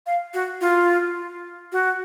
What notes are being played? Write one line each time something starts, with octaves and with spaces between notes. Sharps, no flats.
F5
F#4
F4
F#4